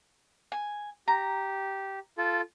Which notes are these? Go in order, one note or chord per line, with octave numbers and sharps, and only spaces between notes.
G#5
G4 A#5
F4 A4